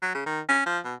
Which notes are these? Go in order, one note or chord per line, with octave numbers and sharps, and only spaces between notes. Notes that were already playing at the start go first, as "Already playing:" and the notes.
F#3
C#3
D#3
C#4
F3
B2